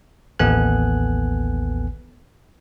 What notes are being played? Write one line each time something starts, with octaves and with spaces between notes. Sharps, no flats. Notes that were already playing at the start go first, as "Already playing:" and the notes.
A1 D#2 B3 A4 G#5 F#6